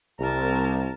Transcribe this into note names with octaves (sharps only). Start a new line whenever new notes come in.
C2 A#4 A5